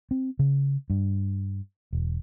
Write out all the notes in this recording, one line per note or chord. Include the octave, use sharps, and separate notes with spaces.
C4
C#3
G2
E1